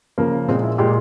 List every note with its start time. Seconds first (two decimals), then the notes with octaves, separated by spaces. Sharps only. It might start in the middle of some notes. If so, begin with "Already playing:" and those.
0.18 C#3 F3 A#3
0.48 A#2 G#3 C4
0.64 E4
0.78 A#2 G#3 G4